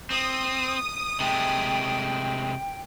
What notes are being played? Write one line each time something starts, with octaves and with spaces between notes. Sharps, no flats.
C4 D#6
C3 G#3 A3 G5